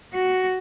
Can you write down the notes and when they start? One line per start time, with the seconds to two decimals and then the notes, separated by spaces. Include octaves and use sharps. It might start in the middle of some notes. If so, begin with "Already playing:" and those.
0.13 F#4